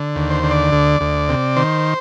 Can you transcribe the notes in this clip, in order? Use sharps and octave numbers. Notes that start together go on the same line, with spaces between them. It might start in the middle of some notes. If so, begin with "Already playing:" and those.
Already playing: D3
D#2
C5
D3
D5
D2
D2
C3
D#3 C5